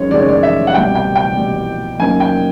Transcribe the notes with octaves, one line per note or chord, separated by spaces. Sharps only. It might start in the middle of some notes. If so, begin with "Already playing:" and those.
Already playing: F#2 D#3 G#3 C#5
F#2 D#3 G#3 D5
C#5
D5
E5
F#5
C2 B2 G3 G5
G5
G5
C2 B2 G3
F#2 D#3 F#3 A#3 G#5
G5